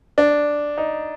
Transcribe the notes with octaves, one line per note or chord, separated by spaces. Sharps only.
D4
D#4